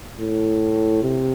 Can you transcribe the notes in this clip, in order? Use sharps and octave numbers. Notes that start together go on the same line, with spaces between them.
A2
C3